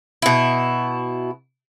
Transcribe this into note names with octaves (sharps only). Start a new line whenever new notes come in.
B2 E4